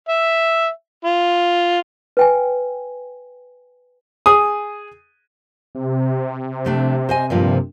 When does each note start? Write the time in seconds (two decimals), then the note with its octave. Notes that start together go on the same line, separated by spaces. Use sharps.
0.09 E5
1.05 F4
2.17 B4 G5 G#5
4.26 G#4 D#6
5.75 C3
6.65 F3 A3 D4
7.09 C5 D#5 G#5
7.30 G2 A#2 F3